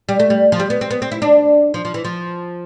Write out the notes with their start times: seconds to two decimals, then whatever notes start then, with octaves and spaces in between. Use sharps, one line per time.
0.09 G3
0.20 A3
0.30 G3
0.52 F3
0.60 G3
0.70 B3
0.81 C4
0.91 B3
1.02 C4
1.12 E4
1.22 D4
1.74 F3
1.85 F3
1.94 E3
2.05 F3